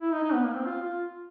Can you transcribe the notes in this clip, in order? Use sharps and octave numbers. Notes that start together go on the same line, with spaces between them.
E4
D#4
D#4
B3
A#3
C4
F4
F4